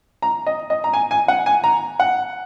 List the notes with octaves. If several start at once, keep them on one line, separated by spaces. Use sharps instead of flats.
A#5
D#5
D#5
A#5
G#5
G#5
F#5
G#5
A#5
F#5